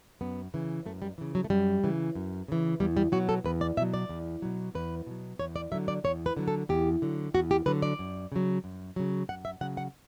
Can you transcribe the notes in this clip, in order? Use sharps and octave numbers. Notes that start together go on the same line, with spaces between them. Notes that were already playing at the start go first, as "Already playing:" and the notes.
F#2 B3
C#3 E3
F#2 A3
G3
C#3 E3
F#3
A3
F#2 G3
C#3 E3
F#2
C#3 E3
E2 G3
G3
B2 F#3 F#4
A4
E2 B4
D5
B2 F#3 E5
D5
E2
B2 F#3
E2 B4
B2 F#3
E2 C#5
D5
D3 F#3 E5
D5
E2 C#5
B4
D3 F#3
A4
E2 G4
D3 F#3
E2 F#4
G4
D3 F#3 B4
D5
F#2
C#3 F#3
F#2
C#3 F#3
F#2 F#5
E5
C#3 F#3 F#5
F#5